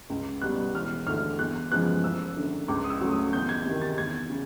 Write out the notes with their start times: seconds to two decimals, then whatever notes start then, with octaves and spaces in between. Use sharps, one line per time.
0.10 C#2
0.42 B2 G3 B3 F#6
0.75 E1 F6
1.07 D2 D3 F6
1.39 E2 F#6
1.71 C#3 F3 G#3 B3 F#6
2.04 F#1 E6
2.36 F#2 D3
2.68 C#2 D6
2.84 D#6
2.90 E6
3.01 C#3 F#3 A3
3.11 D#6
3.33 E2 G6
3.49 G#6
3.66 C3 D#3
3.82 A6
3.98 E2 G#6
4.30 C#3